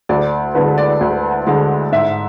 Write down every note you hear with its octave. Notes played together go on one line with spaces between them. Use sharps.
D2 D5
D3 G#3 B4
D5
D2
D3 G#3
G#2 E5